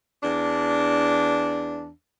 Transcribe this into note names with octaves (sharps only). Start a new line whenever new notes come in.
E2 D4